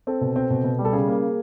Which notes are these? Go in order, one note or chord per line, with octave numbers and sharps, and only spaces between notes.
C4 A4
B2
C4
B2
B2
G3
A4
C#3 G#4
A#3